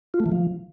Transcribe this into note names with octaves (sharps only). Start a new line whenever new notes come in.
F4
A3
E3
F3